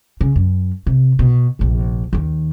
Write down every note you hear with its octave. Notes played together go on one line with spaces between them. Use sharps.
C#3
F#2
C3
B2
F1 A#1
D#2 D#3